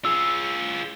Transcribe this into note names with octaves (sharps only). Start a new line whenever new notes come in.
F4 G#4 E6